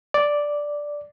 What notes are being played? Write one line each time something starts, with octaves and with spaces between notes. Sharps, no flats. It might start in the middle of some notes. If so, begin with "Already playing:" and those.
D5